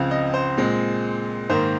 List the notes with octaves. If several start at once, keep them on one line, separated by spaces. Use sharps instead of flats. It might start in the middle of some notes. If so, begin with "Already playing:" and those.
Already playing: C#2 C#3 F3 C4 F5
D#5
C5
A#2 G#3 C4
G#2 D#3 A#3 C5